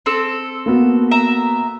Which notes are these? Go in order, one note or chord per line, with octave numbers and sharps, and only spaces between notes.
C4 A4 E6
A#3 B3 F#4
E5 A#5